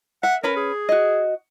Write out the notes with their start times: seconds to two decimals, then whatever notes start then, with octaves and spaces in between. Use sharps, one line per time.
0.23 E5 F#5
0.43 C#4 A#4 B4 B5
0.56 G#4
0.89 F#4 D#5